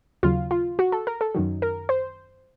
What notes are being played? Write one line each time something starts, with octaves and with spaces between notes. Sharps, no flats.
D#2 C#3 F#3 F4
F4
F#4
A4
A#4
A4
F#2 D#3 F#3
A#4
C5